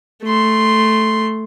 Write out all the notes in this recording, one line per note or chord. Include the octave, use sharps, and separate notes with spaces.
A3 C6